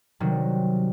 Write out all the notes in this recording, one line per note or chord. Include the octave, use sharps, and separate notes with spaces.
C3 D#3 F#3 G3